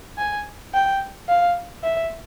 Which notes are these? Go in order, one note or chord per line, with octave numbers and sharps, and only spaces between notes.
G#5
G5
F5
E5